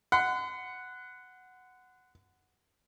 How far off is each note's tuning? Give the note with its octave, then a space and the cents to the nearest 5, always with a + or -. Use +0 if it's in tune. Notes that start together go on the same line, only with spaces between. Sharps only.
F#5 +0 C6 -45